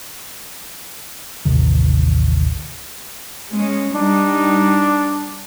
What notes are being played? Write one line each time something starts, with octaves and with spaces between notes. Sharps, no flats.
A1 D#2 C3 D#3
G#3 C#4
G3 D4 D#4